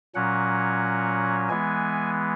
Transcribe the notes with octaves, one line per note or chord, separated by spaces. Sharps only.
A#2 F#3 C#4 F#5
E3 G#3 B3 G#5